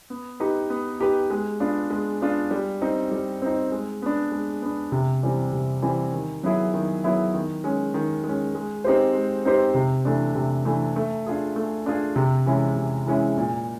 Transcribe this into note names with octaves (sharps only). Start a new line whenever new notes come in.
B3
D#4 G4 B4
B3
D#4 G4 B4
G#3
B3 D4 F4
G#3
B3 D4 F4
G3
C4 D#4
G3
C4 D#4
G#3
B3 D4
G#3
B3 D4
C3
E3 G3 C4
C3
E3 G3 C4
D#3
F#3 B3 E4 G#4
D#3
F#3 B3 E4 G#4
D#3
G#3 C#4
D#3
G#3 C#4
G#3
C4 D#4 G4 C5
G#3
C4 D#4 G4 C5
C3
E3 A3 D4
C3
E3 A3 D4
A3
D4 F4 G#4
A3
D4 F4 G#4
C3
E3 G#3 C#4 E4
C3
E3 G#3 C#4 E4
A#2